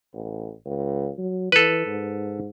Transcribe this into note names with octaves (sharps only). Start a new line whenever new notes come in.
A1
C#2
F#3
E3 A4 B4
G#2